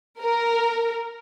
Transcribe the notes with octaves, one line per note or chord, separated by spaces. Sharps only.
A#4